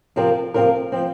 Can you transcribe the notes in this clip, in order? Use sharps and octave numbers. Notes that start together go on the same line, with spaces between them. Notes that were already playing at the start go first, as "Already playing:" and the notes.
C3 F3 C4 F4 A#4
C3 F3 C4 F4 A#4
F3 C4